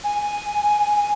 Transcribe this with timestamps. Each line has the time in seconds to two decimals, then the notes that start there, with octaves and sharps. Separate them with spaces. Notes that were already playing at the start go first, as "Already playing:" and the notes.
0.04 G#5